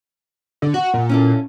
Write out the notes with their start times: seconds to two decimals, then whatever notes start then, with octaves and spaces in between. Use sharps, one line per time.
0.62 D3
0.74 F#4 F#5
0.94 A#2
1.09 C#4 E4 A4